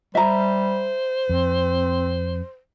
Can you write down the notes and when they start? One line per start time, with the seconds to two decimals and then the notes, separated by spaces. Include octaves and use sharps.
0.15 G3 C5 E5 A#5
1.29 F2 C4